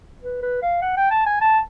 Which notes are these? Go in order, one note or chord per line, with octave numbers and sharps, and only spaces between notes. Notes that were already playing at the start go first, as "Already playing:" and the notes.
B4
B4
F5
F#5
G5
A5
G#5
A5